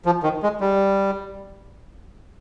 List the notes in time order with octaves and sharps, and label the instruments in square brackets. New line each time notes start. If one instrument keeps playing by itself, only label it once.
[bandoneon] F3
D#3
G#3
G3